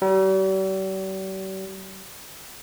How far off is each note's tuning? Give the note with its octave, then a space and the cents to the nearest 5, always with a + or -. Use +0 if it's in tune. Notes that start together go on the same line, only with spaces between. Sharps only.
G3 -45